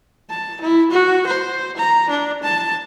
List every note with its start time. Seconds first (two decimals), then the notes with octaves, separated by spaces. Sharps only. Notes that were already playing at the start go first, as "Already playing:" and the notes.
0.30 A5
0.61 E4
0.91 F#4
1.27 C5
1.77 A#5
2.10 D4
2.43 A5